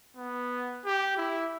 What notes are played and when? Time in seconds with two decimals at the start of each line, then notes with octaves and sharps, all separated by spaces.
0.17 B3
0.85 G4
1.17 E4